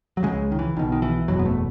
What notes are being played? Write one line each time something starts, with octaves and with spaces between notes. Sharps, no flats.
F#3
C#2 C#3 G#3
D#3
E3
B1 B2 D#3
D#3
E3
F#1 E2 B2 F#3
B3
A3